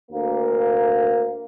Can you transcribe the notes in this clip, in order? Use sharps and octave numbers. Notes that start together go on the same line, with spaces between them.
D2 A#3